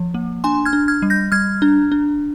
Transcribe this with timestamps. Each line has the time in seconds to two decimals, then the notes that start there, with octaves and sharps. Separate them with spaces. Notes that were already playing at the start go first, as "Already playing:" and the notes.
Already playing: F3
0.14 A#3
0.44 D4 G#5 C6
0.65 F6 G#6
0.73 D4
0.88 F6 G#6
1.02 G3
1.10 G6 A#6
1.32 G3 F6 G#6
1.62 D4
1.92 D4